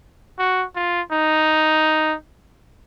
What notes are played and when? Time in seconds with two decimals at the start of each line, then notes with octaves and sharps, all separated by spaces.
0.39 F#4
0.76 F4
1.12 D#4